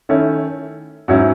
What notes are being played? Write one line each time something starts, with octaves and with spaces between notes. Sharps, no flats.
D#3 A3 C#4 E4
G#2 F#3 C#4 E4